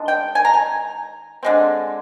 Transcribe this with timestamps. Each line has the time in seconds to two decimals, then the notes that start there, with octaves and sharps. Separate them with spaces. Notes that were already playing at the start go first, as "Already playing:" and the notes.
Already playing: D#3 G#3 D4
0.08 G5
0.35 G#5
0.45 A#5
0.54 G#5
1.43 D3 G#3 C4